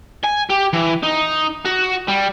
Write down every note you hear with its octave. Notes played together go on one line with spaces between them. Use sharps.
G#5
G4
E3
D#4
F#4
G3